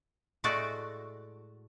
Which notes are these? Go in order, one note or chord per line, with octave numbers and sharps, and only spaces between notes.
A2 G#3 A3 F#4 D5 A5